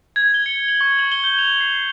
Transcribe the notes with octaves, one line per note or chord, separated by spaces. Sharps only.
G#6
G7
C#7
F#7
C#6
F#7
G7
G6
F7
C7